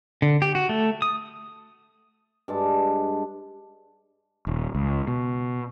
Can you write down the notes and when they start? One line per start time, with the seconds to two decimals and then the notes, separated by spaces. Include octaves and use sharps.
0.22 D3
0.42 G4
0.55 F#4
0.69 A3
1.02 D#6
2.48 G2 G#3 A5
4.47 D#1
4.75 C#2
5.08 B2